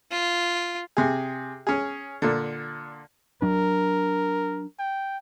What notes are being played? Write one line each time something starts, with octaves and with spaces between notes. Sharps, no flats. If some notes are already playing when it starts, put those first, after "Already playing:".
F4
C3 G#4
C#4 G#4
A#2 D3
F#3 D4 A#4
G5